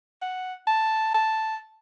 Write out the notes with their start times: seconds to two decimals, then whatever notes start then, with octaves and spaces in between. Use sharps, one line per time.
0.22 F#5
0.67 A5
1.14 A5